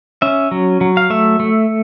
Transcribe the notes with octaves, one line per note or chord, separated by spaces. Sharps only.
C#4 E5
F#3
F#3
F5
A3 E5
A3